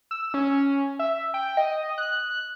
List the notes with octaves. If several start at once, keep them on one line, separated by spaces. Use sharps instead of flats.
E6
C#4
E5
G5
D#5
F#6